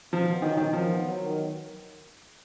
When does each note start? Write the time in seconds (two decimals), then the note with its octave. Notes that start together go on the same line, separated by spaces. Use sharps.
0.12 B2 F3
0.27 B3
0.42 D#3 F#3
0.57 B2 D#3
0.73 D#3 F3
0.88 B3
1.03 F#3
1.18 D#3